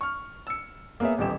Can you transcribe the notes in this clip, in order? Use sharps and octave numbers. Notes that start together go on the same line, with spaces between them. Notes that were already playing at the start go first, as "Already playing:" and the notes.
C#6 F6
E6 C#7
A#3 B3 G#4 C#5 E5
D#1 A1 G4 E7